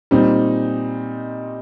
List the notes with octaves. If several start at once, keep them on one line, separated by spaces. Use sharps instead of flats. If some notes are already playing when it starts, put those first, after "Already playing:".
A#2 G3 C4 D#4